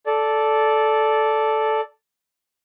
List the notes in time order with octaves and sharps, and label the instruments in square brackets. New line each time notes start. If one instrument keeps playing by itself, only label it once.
[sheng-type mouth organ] A4 D5